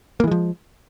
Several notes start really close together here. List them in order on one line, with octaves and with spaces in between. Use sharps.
A#3 E3 G#3 F3